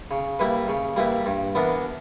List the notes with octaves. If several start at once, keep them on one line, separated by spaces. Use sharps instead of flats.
C#3
G3 A#3 E4 B4
C#3
G3 A#3 E4 B4
G2
E3 B3 D4 A#4